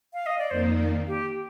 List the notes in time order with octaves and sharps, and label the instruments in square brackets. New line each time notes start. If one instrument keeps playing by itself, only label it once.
[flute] F5
D#5
D5
[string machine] F2 D#3 A#3 [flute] C5
[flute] D5
G4